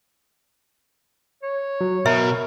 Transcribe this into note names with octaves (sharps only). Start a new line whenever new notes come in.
C#5
F#3
B2 A#4 E5